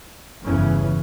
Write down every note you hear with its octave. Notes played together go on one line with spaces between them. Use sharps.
G1 E2 C#3 E3 C#4